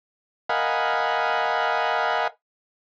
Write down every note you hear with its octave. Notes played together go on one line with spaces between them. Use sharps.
A#4 D#5 F5 F#5 G#5 B5